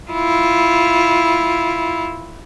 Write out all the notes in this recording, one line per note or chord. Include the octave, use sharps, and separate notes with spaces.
E4 F4